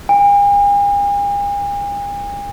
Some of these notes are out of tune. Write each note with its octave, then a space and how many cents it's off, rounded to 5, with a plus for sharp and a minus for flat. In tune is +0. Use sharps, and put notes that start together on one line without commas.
G#5 -45